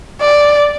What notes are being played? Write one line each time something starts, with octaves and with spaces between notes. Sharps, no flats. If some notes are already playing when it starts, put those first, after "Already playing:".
D5